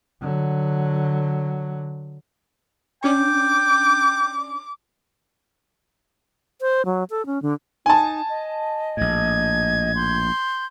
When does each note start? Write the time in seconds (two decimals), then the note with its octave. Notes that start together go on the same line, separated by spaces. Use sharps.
0.21 D3 F#3
3.04 C#4 D4 G5 D6
6.61 C5
6.86 F#3
7.10 A4
7.26 C#4
7.42 D3
7.86 D#4 G#5 A5
8.28 D#5
8.97 A#1 A2 G#6
9.95 C6 G6